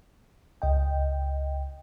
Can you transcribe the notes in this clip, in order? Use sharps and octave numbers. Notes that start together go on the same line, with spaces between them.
C#2 D#5 G5